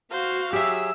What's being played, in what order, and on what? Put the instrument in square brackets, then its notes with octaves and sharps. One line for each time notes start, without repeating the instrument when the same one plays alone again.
[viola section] F#4 F5 [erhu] C5
[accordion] F#3 G#4 [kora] G4 E5 [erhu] E6